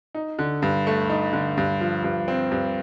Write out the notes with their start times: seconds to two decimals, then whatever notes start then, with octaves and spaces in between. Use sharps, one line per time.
0.15 D#4
0.39 D3
0.62 G2
0.87 A3
1.09 D#4
1.33 D3
1.57 G2
1.81 F3
2.04 G2
2.28 C4
2.51 G2